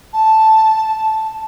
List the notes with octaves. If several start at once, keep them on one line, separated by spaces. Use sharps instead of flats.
A5